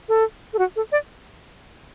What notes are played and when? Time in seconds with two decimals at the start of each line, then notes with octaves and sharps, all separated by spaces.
0.09 A4
0.54 A4
0.59 F#4
0.76 A4
0.92 D5